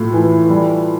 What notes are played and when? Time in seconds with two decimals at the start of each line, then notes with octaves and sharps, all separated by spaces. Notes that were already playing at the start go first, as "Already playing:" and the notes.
Already playing: A2 F4 A4
0.13 E3
0.50 G3